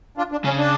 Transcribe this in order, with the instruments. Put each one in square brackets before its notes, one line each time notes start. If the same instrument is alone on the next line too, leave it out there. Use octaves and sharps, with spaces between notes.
[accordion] D4 F4
D4
[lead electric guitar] C#3 [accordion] C#4
[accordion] D4